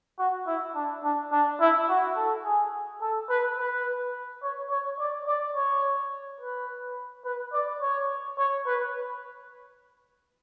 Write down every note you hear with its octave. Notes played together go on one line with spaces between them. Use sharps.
F#4
E4
D4
D4
D4
E4
F#4
A4
G#4
A4
B4
B4
C#5
C#5
D5
D5
C#5
B4
B4
D5
C#5
C#5
B4